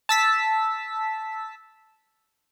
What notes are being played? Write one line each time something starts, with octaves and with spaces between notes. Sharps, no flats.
A5 E6 B6